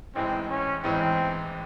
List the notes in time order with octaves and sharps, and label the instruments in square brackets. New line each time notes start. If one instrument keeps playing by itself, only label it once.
[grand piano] A1 G#2 E3 G#3 [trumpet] C4
[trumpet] C#4
[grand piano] A1 G#2 E3 G#3 [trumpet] C4